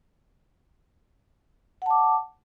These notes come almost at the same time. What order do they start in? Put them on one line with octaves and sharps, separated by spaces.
F#5 A5 D6